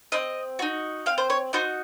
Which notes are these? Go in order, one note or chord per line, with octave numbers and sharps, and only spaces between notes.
C4 D#5
D#4 F#4
C4 F5
C5
C#5
D#4 F#4 C5